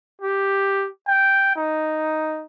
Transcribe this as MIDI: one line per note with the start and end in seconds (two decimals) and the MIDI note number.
0.21 0.88 67
1.08 1.52 79
1.56 2.44 63